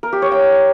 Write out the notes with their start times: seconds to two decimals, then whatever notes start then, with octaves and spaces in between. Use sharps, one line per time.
0.03 A#4
0.13 G4
0.22 C#5
0.32 G5